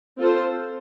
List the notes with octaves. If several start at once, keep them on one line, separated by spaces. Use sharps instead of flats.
C4 F4 A4 C5